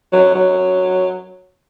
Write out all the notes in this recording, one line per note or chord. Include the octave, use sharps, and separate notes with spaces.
F#3
F#3